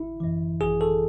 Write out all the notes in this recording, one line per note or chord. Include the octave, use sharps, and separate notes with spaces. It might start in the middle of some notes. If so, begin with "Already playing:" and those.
Already playing: G#1 E4
F#2 E3
G#1 G#4
A4